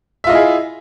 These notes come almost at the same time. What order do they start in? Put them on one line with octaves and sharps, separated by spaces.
E5 F4 D#5 E4 G#4